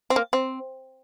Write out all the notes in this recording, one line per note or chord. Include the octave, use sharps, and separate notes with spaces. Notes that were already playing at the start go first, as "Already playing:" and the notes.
C4
A#3
C4